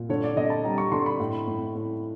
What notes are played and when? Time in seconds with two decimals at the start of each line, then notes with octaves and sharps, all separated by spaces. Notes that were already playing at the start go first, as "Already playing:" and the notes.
Already playing: A#2
0.09 D3 C#5
0.23 D5
0.36 D3 D#5
0.50 A5
0.64 G3 A#5
0.78 C#6
0.92 D3 C6
1.06 B5
1.20 A2
1.47 A2
1.75 A2